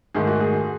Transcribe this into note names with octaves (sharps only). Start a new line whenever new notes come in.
G#2 D#3 A3 G#4
F#4
G#4